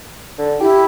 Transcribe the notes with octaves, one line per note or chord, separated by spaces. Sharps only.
D3
E4 G4